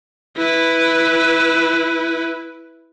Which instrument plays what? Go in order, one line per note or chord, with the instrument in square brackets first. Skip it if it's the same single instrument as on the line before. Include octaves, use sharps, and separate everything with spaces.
[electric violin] E4 B4